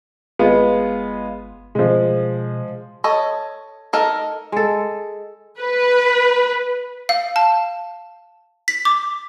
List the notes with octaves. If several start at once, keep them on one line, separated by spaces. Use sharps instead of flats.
G1 G#3 B3 F4
B2 F3 G#3
A4 C#5 D#5
D#4 A4 A#4
G#3 A4
B4
F5
A5
B6
D6